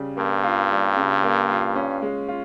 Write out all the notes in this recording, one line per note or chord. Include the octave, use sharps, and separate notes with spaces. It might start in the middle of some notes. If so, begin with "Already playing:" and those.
Already playing: C#3 G3
G2 A#3
F4
G3
C#3
A#3
F4
C#4
G#3
F4